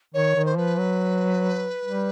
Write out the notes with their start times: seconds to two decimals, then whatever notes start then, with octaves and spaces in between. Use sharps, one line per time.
0.14 D#3 C#5
0.35 D#3
0.45 C5
0.57 F3 B4
0.78 F#3
1.85 G3